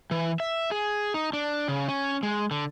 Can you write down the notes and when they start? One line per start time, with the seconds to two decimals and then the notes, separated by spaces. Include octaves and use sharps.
0.11 E3
0.40 E5
0.71 G#4
1.14 D#4
1.33 D4
1.68 C#3
1.88 C#4
2.23 G#3
2.51 D3